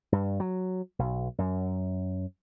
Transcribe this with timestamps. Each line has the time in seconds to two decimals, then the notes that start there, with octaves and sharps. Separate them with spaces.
0.12 G2
0.40 F#3
0.99 B1
1.38 F#2